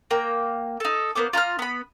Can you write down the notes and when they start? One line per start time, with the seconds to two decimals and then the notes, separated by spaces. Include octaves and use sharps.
0.11 A#3 G5 A#5
0.80 D#4 A4
1.15 A#3 B3 C5 D6
1.33 F4 A#5 C6 F6
1.59 B3 B5